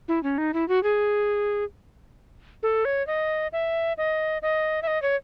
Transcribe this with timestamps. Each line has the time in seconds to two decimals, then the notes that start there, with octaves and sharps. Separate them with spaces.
0.08 E4
0.23 C#4
0.38 D#4
0.54 E4
0.68 F#4
0.83 G#4
2.63 A4
2.85 C#5
3.07 D#5
3.53 E5
3.98 D#5
4.42 D#5
4.82 E5
4.87 D#5
5.02 C#5